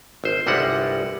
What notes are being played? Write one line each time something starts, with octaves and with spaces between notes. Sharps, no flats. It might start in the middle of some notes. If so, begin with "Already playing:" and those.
G#1 C5
G1 C2 G3 G#3 F#5